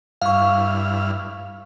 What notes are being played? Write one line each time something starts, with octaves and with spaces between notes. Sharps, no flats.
G2 E4 F5 C#6 F6